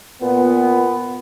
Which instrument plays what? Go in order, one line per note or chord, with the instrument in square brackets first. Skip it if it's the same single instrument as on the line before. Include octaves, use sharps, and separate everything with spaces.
[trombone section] A#2 B3